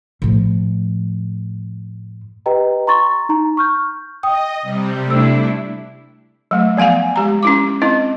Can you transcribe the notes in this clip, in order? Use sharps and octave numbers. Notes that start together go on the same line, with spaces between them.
A2 F3
G4 B4 D#5 G5 A#5
A#5 C6 C#6 A6
D#4 A#5
C#6 F6 G6
D#5 G5 D#6
C3 G3
A3 D4 E4 E6
F#3 A3
F3 B3 F5 F#5 G#5
G#3 G4 A#5
C#4 E4 D6
C4 E4 D#5